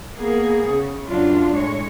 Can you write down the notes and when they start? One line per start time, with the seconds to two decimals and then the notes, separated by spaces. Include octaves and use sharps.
0.14 A#3 B3 G#4
0.67 C#3
1.08 F#2 F#3 D4 F4
1.54 A2 G#3 C#5